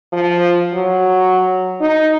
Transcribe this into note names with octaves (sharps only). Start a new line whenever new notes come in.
F3
F#3
D#4